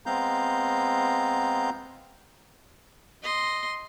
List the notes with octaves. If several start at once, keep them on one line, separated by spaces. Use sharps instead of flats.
G#3 B3 C4 F5 A#5 G6
D#5 C6